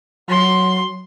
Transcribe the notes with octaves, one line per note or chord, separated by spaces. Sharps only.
F#3 C6